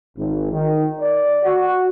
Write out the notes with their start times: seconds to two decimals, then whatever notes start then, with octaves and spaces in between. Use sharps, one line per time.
0.17 G#1
0.52 D#3
1.00 D5
1.44 F#4